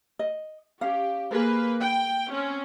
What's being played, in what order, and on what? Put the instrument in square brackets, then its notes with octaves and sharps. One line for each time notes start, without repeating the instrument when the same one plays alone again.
[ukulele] D#5
[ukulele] C#4 F5 [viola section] G4
[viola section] A#3 B4 [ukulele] G#4 C5
[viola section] G5
C4 C#4